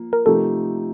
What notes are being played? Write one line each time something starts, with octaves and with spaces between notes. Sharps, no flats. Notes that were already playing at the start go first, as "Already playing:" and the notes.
Already playing: F3 A#3
A#4
C3 F3 A3 D#4 G4 A4